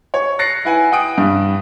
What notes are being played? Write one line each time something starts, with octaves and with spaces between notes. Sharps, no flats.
C#5
F#6 A6 A#6 C7 C#7
E4 B4 F#5 G#5
F#5 G5 D#6 D7
G2